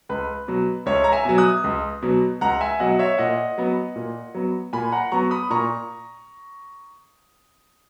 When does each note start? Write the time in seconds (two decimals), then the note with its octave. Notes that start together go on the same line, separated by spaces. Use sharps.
0.09 C#2 B4
0.48 B2 F#3
0.86 C#2 C#5 E5
1.04 A#5
1.12 E5 G#5
1.25 B2 F#3
1.38 D#6 F#6
1.64 C#2
2.02 B2 F#3
2.41 C#2 F#5 A#5
2.61 E5 G#5
2.80 B2 F#3 D#5 F#5
2.99 C#5 E5
3.18 A#2 D#5 F#5
3.58 F#3 B3
3.96 A#2
4.35 F#3 B3
4.73 A#2 G#5 B5
4.92 F#5 A#5
5.12 F#3 B3 A#5 C#6
5.31 B5 D#6
5.50 A#2 A#5 C#6